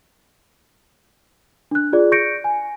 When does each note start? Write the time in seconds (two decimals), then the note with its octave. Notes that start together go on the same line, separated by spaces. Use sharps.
1.71 D4 F#6
1.93 F4 G#4 D5
2.12 C#6 G6 A#6 C#7 D7
2.44 G#5